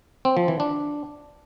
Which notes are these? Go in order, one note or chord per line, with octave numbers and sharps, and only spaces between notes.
C4
F3
E3
D4